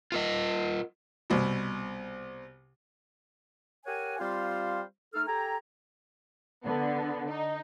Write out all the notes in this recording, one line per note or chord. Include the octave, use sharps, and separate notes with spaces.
F4 A#4 D#5
C2 B2
G4 A#4 C#5 F#5 G#5
G3 C4 F4 C5 F5
A3 D#4 A4 F6
G4 A4 G5 G#5 A#5
D3 B3
D#4